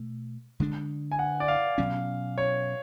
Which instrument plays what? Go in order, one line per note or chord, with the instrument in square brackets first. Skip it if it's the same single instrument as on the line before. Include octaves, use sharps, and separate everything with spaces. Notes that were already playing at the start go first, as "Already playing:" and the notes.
Already playing: [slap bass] B2 A3
D3 G#3 D4
[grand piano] G#5
F#5
D5
F5
[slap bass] B2 F#3 C#4
[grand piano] C#5